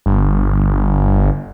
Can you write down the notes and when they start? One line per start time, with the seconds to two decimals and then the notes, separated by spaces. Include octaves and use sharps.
0.06 G1